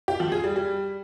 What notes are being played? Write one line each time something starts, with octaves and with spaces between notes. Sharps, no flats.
G4
F3
G#4
G3
G3